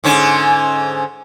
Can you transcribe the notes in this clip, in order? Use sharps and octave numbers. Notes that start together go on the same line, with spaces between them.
G#2 D3 C#4